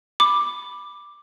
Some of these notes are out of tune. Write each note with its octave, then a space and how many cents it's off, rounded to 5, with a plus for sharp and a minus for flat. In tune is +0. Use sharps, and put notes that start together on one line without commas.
B5 +0 D6 +5